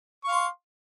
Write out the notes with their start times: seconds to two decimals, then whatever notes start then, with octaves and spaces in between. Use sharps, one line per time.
0.24 C#6
0.28 F5
0.32 C6